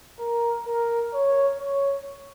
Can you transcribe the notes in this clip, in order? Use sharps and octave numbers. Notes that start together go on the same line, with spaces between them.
A#4
A#4
C#5
C#5